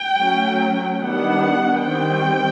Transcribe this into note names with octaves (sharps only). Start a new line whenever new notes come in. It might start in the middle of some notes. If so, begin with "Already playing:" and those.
Already playing: G5
F#3 A3 C#4
D#3 G3 B3 D4 F#5
D#3 G3 C4 G5